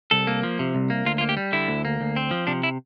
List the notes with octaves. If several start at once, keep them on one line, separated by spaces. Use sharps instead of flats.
C2 A4
A#3
F3
C3
C2
A#3
D2 F4
F4
A#3
G4
G3
D3 E4
D2
A#3
D2
C4
F3
C3 D4
E4